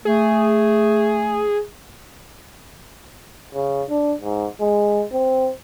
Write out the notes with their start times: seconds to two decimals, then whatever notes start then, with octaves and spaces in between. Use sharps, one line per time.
0.05 A3 G#4
3.54 C#3
3.89 D4
4.21 G#2
4.60 G#3
5.13 C4